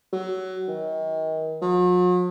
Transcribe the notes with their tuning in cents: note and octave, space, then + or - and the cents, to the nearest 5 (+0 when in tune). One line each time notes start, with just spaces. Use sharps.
F#3 +20
D#3 +35
F#3 -45